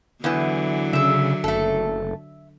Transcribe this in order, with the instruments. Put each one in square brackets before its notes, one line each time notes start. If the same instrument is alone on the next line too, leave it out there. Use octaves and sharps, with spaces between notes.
[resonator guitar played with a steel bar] E2 E3 [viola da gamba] D3 F#3
[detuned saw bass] C#3 [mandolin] E5 E6
[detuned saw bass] F#1 [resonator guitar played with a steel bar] A3 A4